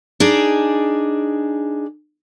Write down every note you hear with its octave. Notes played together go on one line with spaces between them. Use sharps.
D4 D#4 G#4 D5